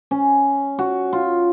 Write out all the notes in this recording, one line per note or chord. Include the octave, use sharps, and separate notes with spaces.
C#4
F#4
F4